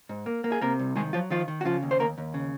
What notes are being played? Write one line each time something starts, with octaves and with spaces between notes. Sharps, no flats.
G#2
A#3
A#3
G#4
C3 A#3 A#4
C2
D#3 G#3 G#4
F3 F#3 F4
D#3 F3 F4
D#3
F#4
C#3 F3 F4
D#2
C5
D#2 A#3 A#4
D#2
C#3